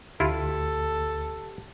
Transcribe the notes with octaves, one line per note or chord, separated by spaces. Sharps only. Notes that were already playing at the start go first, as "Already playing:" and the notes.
D2 E4 F4 G4 A4